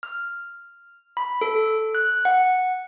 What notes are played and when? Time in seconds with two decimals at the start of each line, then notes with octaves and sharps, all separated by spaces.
0.03 F6
1.17 B5
1.41 A4
1.95 F#6
2.25 F#5